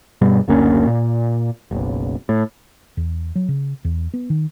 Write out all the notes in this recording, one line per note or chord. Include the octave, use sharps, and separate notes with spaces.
G2 B2 G3
F#1 D2 A#3 C#4
A#2
F#1 B1
A2
E2
F#3
C#3
E2
B3
D#3